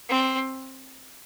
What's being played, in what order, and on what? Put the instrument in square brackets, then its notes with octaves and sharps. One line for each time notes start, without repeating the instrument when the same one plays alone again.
[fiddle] C4